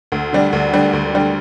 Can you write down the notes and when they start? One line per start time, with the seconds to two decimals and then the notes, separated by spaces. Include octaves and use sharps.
0.12 D2
0.33 D3 G3 D4
0.53 D2
0.73 D3 G3 D4
0.93 D2
1.13 D3 G3 D4